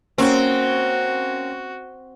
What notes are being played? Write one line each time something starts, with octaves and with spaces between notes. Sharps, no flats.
A#3 C4 C#4 F#4